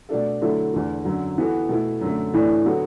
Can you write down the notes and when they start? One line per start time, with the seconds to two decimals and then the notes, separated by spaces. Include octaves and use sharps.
0.09 B2 A3 D4 A4
0.41 D3 F#3 A3 E4 A4
0.74 E2 D3 A3
1.05 F#2 D3 F#3
1.38 E3 B3 F#4 A4
1.69 B2 A3 E4
2.01 F#2 D3 A3
2.34 A2 E3 D4 A4
2.65 D3 F#3 B3 F#4 A4